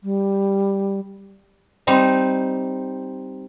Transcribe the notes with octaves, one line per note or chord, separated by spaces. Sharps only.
G3
G3 C4 D#4